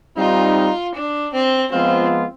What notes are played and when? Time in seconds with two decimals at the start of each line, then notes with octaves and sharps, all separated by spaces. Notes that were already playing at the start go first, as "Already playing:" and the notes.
0.17 G3 C4 D#4 F4
0.94 D4
1.33 C4
1.70 F3 G#3 B3 C4 F4